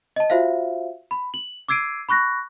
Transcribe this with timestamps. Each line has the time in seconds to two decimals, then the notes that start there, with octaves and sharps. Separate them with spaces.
0.16 D#5 A5
0.30 F4 F#4 C5 E5 F5
1.11 B5
1.34 F#7
1.68 D6 E6 G#6 C7 D7 D#7
2.09 B5 C#6 F#6 A#6